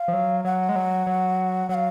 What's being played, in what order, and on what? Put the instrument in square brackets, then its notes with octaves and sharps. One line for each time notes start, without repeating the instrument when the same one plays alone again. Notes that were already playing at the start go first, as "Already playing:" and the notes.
Already playing: [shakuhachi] F5
[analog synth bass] F3
F#3
[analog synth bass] F#3 [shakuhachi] F#5
[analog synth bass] G#3
F#3
F#3
[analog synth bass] F#3 [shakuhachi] F#5
[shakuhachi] F5